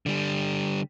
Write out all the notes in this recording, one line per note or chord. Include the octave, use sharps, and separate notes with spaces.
D3 G3